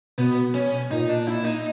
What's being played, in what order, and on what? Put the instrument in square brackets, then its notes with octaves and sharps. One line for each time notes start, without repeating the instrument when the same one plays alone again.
[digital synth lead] B2 [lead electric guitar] B3
[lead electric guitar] C#4
[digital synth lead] A#2 [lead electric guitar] D#4
[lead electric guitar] D4
E4
D#4